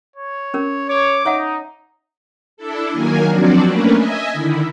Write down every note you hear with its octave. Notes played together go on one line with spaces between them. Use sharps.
C#5
C#4 A#4
C#5 D6
D#4 C#5 E5 F#5
D4 E4 A4
D#3 F#3 A#3 A#4 G#5
F3 F#3 C4 D4 F#4 D5
A3 A#3 C#4 D4 A#4 B4
D#5 E5 G#5
D3 D#3 E4